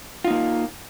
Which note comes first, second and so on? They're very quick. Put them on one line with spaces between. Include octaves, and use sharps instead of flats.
F4 D#4 A#3